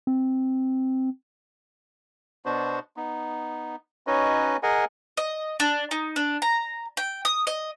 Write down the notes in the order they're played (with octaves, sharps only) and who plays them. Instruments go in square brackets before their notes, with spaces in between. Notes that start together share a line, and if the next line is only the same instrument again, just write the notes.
[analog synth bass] C4
[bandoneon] B2 B3 D4 F#4 C5
B3 D#4
C#4 D#4 F#4 B4 C#5 D#5
G#4 A#4 D#5 F#5 G#5
[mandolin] D#5
D4
D#4
D4
A#5
G5
D#6
D#5